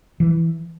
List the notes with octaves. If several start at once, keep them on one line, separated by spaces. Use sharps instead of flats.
E3